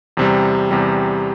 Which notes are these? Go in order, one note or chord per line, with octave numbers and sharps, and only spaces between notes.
E2 C3 G3
E2 C3 G3